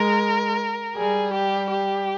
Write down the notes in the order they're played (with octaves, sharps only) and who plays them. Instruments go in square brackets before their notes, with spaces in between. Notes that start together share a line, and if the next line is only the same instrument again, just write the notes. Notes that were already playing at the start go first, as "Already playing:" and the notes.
Already playing: [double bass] G#3 [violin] A#4
[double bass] G3 [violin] G#4
[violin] G4
G4